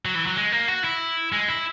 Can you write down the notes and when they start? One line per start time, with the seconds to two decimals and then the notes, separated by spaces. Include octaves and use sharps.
0.05 F#3
0.15 E3
0.26 F#3
0.36 G#3
0.52 A#3
0.68 F#4
0.84 E4
1.33 G#3
1.48 E4